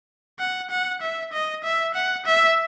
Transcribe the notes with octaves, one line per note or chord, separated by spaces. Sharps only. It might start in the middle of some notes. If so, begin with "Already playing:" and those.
F#5
F#5
E5
D#5
E5
F#5
E5